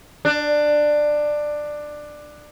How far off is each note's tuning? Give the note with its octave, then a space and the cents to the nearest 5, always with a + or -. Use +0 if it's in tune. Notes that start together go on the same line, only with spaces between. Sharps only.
D4 +15